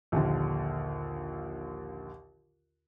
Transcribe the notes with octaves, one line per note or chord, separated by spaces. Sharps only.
A#1 D#2 D3